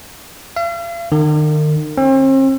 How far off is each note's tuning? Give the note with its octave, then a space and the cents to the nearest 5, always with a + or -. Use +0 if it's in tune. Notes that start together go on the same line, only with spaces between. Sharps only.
F5 -45
D#3 -40
C4 +40